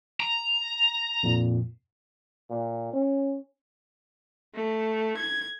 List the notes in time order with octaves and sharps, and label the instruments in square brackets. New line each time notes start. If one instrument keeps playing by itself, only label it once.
[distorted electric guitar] A#5
[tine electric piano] F2 A#2
[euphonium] A#2
C#4
[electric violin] A3
G#6